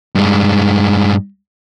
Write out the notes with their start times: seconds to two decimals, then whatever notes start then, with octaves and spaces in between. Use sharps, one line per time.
0.15 G2 G#3